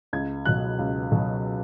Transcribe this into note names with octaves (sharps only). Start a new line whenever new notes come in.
C#2 G#6
B2 F#3 F#6
C#2
B2 F#3